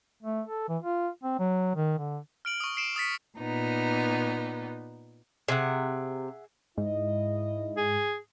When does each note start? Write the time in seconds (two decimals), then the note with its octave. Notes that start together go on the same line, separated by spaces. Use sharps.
0.23 A3
0.47 A4
0.68 E3
0.82 F4
1.23 C4
1.39 F#3
1.75 D#3
1.98 D3
2.45 F6 D7 F#7
2.60 C#6 D#6
2.77 C7 D7 E7
2.96 D#6 A6 B6 C#7
3.38 A#2 B3 D#4
5.48 C3 G#4 E5 F#5
6.78 G#2 E4 D#5
7.77 G#4